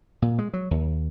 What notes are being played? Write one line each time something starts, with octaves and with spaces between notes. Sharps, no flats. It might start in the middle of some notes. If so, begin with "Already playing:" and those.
A#2
G#3
F#3
D#2